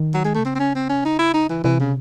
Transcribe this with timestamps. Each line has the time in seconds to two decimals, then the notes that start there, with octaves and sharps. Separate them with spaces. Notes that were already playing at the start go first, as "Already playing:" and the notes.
Already playing: D#3
0.14 F#3
0.24 G#3
0.34 A3
0.39 C3
0.44 C#3 C4
0.55 C4
0.59 C#4
0.75 C4
0.89 C#4
0.95 C3
1.04 C#3 D#4
1.19 E4
1.34 D#4
1.49 E3
1.64 C3 E3
1.80 C#3